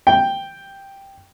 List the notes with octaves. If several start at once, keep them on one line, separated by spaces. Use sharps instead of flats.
G5